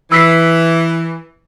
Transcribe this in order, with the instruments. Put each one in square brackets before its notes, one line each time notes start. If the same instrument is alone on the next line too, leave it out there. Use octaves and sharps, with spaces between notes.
[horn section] E3 [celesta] E6 B6 C7